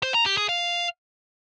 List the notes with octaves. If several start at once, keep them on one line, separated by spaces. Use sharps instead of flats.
C5
A#5
G4
G#4
F5